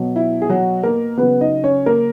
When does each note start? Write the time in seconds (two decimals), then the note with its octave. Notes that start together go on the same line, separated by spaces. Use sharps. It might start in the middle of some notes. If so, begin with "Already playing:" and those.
Already playing: B2 F#3
0.16 E4
0.42 G#4
0.49 F#3 F#4
0.83 A#3 A#4
1.18 C#3 F#3 B3 B4
1.41 D#4 D#5
1.63 C#4 C#5
1.86 A#3 A#4